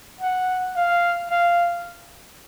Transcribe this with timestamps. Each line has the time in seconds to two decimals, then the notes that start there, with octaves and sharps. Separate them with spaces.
0.21 F#5
0.76 F5
1.31 F5